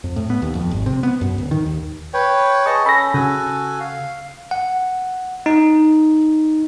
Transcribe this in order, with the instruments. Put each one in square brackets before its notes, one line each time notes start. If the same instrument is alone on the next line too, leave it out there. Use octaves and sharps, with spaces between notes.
[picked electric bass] F2
A2
B3
D#2
F2
G#1
C3
B3
F#2
D1
D#3
D#2
[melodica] B4 C#5 G5
[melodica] G#4 D#5 A5 [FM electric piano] C#6
[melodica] C#4 A4 [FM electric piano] B5 A#6
[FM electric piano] C#3 [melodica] F#4 A4 G#5
[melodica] F5
[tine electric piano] F#5
D#4